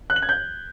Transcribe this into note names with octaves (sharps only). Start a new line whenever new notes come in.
F#6
F#7
G#6
G6